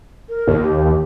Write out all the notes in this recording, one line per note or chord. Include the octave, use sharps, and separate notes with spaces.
A#4
D#2 A#4
G4